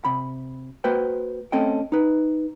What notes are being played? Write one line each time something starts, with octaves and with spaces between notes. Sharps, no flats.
C3 B5
A#3 F#4 B4 C5 G5
A3 C4 C#4 A4 D#5 G5
D#4 B4